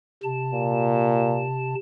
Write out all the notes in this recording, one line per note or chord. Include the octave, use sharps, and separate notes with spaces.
C3 A5
A#2